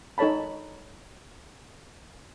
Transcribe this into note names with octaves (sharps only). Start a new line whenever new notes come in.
D#4 A4 C#5 A5 B5